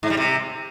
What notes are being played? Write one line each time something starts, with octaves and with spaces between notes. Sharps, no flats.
G#2
G3
C3